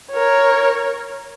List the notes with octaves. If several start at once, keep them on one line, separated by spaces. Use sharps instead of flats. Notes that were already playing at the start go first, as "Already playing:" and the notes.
A#4 C#5